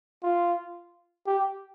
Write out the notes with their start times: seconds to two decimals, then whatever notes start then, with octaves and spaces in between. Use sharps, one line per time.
0.23 F4
1.27 G4